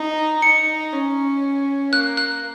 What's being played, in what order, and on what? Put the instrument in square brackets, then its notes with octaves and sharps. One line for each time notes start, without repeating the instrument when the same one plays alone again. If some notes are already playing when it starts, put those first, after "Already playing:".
Already playing: [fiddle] D#4
[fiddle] D#4 [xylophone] C#7
[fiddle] C#4
[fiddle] A#3 [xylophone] F#6
[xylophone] F#6